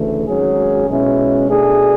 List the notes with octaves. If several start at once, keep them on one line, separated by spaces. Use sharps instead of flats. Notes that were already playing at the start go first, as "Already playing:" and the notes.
Already playing: D2 C#3 E3 A3
G#1 G#2 F#3 C#4 G#4
B1 B2 G#3 C#4 E4
B2 A3 D4 G#4